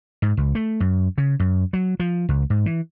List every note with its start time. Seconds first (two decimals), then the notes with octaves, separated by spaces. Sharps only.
0.22 G#2
0.37 C#2
0.55 A3
0.80 F#2
1.18 C#3
1.40 F#2
1.73 F#3
2.00 F3
2.29 C#2
2.50 G#2
2.66 E3